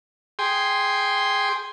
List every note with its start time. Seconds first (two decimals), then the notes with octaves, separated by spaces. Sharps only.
0.39 G#4 G5 C6